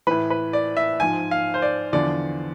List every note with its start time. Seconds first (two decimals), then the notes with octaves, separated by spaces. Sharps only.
0.07 A2 E3 B4
0.30 B4
0.53 D5
0.77 E5
1.00 G#2 F3 G#5
1.31 F5
1.54 C5
1.62 D5
1.93 E2 D3 F3 D5